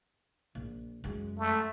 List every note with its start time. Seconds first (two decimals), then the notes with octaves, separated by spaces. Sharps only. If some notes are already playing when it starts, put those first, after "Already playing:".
0.55 A#1
1.04 F#2 G#3
1.39 A3